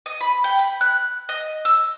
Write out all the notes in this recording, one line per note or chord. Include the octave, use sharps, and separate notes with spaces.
D#5
B5
G5
B5
F#6
D#5
E6